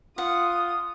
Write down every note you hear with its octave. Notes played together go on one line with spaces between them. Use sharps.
F4 F#5 D#6